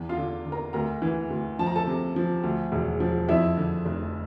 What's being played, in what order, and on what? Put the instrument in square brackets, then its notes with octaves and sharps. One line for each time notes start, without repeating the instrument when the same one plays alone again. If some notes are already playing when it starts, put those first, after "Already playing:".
Already playing: [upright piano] E2
F4 F5
D3
D3
A#4 A#5
D2 A#4 A#5
E3
D2
F3 A5
A#5
A4 A5
C3
F3
D2
E1
F3
F2 E4 E5
D3
F1